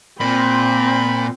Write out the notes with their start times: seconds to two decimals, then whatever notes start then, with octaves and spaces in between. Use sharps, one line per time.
0.20 A#2 C4 B5